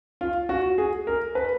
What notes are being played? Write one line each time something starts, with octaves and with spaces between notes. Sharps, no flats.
F4
F#4
G#4
A#4
B4